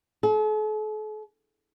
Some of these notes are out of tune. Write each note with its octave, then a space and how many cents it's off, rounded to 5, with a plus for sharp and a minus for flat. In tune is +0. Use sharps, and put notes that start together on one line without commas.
A4 -45